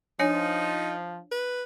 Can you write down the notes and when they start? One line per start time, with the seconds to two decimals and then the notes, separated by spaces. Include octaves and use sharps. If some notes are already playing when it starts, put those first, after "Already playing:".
0.19 F3 D4 D#4 C#5 G#5
1.31 B4